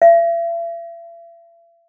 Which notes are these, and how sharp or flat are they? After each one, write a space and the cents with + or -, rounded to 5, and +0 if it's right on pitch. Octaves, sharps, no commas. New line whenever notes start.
E5 +40